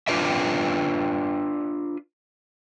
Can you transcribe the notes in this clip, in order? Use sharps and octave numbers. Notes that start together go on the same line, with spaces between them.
D4 F4 B4 D5 E5